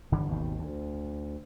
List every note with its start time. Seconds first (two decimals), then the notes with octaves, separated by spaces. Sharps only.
0.12 G1 D3 E3 G3
0.29 G#1 D#2 B2 D#3
0.59 D2